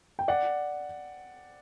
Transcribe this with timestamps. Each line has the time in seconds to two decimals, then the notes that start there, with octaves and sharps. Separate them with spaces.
0.19 G5
0.28 D5 F#5